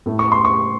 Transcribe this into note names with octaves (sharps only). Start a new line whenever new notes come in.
A2 A3
C#6
C6
C#6